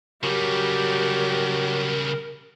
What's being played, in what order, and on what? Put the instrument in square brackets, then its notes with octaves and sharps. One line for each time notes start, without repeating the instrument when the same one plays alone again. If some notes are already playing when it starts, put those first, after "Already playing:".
[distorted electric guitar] C#3 G3 [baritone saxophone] F#3 [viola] G4 [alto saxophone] A#4